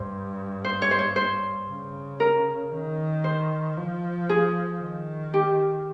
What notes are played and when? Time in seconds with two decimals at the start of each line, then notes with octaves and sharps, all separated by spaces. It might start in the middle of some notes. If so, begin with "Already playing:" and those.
Already playing: G2 C5
0.65 C5
0.82 C#5
0.91 C5
0.99 C#5
1.16 C5
1.69 C#3
2.20 A#4
2.72 D#3
3.24 C5
3.77 F3
4.29 G#4
4.81 D#3
5.34 G4